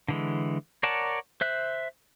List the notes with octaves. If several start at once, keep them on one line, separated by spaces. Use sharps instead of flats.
D3 E3 G#3
A#4 C#5 D5 F#5 A5
C5 E5 F#6